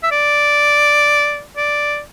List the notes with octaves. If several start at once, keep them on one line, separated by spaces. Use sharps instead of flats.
E5
D5
D5